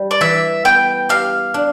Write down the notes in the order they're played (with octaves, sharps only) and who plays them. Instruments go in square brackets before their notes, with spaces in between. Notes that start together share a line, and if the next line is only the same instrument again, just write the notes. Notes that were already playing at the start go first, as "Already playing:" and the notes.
Already playing: [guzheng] G3
[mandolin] D5
[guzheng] E3 [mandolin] E5
[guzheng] B3 [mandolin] G5
[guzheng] G4 [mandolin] F5
[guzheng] D4